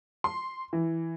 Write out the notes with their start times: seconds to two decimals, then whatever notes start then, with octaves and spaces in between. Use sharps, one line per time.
0.24 C6
0.73 E3